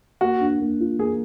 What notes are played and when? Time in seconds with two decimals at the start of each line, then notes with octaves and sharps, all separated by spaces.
0.21 A#3 F#4
0.41 D4
0.60 A#3
0.80 F4
0.99 A#3 G#4